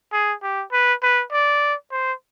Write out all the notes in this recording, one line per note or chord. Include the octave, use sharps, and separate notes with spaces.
G#4
G4
B4
B4
D5
C5